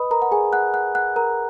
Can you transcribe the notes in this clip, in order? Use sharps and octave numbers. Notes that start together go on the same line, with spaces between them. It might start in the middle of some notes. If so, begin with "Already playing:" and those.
Already playing: B4 D#5 B5 D#6
A#4 A#5
F#5
G#4 G#5
F#5 F#6
F#5 F#6
F#5 F#6
A#4 A#5